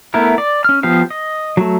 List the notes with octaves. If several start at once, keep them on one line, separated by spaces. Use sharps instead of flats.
A3 B3 E4 A#4
D5
C#4 F6
F3 B3 G4 F5
D#5
F#3 A3